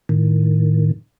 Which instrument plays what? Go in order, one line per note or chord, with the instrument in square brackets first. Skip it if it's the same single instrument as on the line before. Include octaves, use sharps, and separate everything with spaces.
[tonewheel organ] A2 D#3